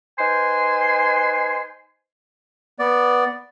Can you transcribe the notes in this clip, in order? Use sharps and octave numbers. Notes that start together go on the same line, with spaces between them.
D#4 B4 C5 G#5 C6
B3 D5